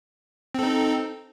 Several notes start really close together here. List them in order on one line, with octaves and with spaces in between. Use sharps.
C4 A4 D#4